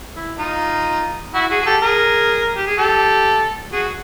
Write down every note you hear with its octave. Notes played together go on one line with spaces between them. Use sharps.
E4
D#4 F4
E4 F#4
F#4 G#4
G#4
G4 A4
G#4 A#4
G4
G#4
G4 A4
F#4 G#4